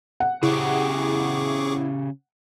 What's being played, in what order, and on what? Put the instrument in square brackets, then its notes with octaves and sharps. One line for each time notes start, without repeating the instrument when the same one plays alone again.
[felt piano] F#5
[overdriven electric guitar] C#3 G4 [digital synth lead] E4 [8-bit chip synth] G#4 C#6 D6